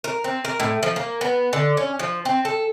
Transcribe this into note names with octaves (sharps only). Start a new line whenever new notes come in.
A#4
C4
A#4
A2
F3
A#3
B3
D3
C#4
F3
C4
A4